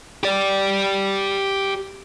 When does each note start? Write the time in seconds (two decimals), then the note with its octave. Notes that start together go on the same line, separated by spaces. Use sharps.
0.23 G4 D5